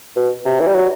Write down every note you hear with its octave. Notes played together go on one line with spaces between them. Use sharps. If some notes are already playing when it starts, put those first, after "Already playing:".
B2
C3
E3
G3
F#3